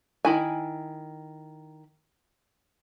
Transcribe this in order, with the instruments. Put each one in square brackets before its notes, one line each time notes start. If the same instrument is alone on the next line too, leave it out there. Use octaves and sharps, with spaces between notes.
[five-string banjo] D#3 E4 G#5